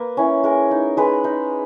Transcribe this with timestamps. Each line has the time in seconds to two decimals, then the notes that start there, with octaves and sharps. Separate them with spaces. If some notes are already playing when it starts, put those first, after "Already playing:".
Already playing: A#3 B4
0.17 C#4 E4
0.44 G#3 A#4
0.71 D#4
0.97 G#3 B4
1.24 D#4